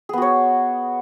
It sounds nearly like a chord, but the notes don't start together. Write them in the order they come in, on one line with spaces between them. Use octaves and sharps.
G#4 B3 F#4 C#5